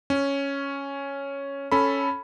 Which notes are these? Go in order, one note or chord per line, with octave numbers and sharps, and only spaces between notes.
C#4
C#4 A4 B5